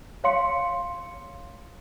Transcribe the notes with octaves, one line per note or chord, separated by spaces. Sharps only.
C#5 F5 C6 C#7